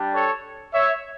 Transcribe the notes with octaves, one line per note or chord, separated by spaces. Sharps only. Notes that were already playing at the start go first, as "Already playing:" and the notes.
Already playing: G3 D4 G4
A4 C#5
C#5 E5